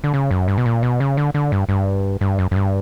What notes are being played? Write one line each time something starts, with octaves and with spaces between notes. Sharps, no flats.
D3
C#3
F#2
G2
B2
A#2
B2
C#3
D3
D3
G2
G2
G2
F#2
F#2
G2